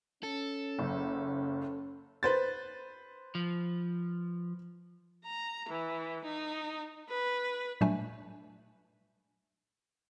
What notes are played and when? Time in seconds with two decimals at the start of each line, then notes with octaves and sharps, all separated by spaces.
0.23 C#4 A4
0.79 F#1
2.23 B4 C5 A6
3.35 F3
5.25 A#5
5.69 E3
6.24 D#4
7.09 B4
7.81 A#2 F#3 G3 A3 D4 G#5